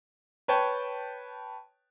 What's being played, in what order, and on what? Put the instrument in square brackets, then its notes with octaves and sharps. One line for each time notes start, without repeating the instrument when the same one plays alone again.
[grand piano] B4 C#5 G5 A5